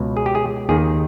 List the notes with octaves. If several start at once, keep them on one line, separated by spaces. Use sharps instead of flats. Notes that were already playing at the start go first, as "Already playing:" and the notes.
Already playing: C#2 B2
G#4
G4
G#4
D#2 D#3 G#4